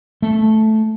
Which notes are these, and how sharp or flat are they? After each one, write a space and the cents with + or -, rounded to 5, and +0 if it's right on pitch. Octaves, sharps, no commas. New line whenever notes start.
A3 -10